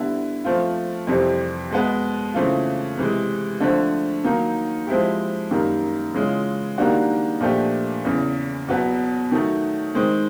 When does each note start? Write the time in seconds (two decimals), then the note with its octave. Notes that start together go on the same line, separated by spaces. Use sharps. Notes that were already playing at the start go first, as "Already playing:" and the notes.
Already playing: D3 G3 B3 E4
0.44 F3 A3 C4 F4
1.07 F2 C3 E3 G3 C4
1.71 B2 G#3 B3
2.34 C#3 E3 A3 C4 F4
2.97 C3 E3 G#3
3.60 D3 F3 A3 C4
4.24 D#3 F#3 A#3 D#4
4.87 F3 G#3 C4 E4 G4
5.51 F#2 D#3 G3 A#3
6.14 C#3 E3 G#3 C#4 F4
6.78 D#3 G3 A#3 D4 F#4
7.41 A#2 F3 A3 D4 G4
8.05 E2 C#3 E3
8.68 E2 B2 F#3 B3
9.32 D#3 F#3 A3
9.94 D#3 G#3 C4